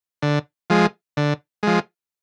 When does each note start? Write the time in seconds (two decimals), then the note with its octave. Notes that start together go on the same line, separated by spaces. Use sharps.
0.22 D3
0.70 F3 G#3
1.17 D3
1.63 F3 G#3